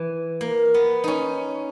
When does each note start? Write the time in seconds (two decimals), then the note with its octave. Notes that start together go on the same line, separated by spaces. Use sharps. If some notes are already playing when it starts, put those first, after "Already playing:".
Already playing: E3
0.41 A#3
0.74 B3
1.04 C#4 D#4